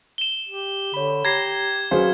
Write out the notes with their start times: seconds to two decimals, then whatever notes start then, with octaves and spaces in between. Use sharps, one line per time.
0.18 E7 G7
0.49 G4
0.94 D3 C#5 B5
1.25 G4 A#5 G#6 A#6 C7
1.91 F#3 C#4 G#4 B4 C5 F5